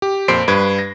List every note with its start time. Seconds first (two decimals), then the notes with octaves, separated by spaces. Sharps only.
0.02 G4
0.28 F2 A#2 C5 B6 C7 D7
0.48 G2 B4 G#6 D7
0.79 A#6